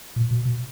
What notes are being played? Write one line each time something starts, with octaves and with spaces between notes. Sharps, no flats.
A#2
B2
B2